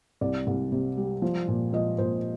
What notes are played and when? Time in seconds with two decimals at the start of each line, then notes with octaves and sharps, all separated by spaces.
0.21 C2 D5
0.47 C2
0.72 C3
0.97 G3
1.22 F3
1.48 A#2
1.73 F3 D#5
1.98 A#2 C5